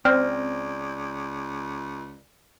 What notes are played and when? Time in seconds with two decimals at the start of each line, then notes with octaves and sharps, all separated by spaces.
0.05 C#2 C4 D5 F6 A#6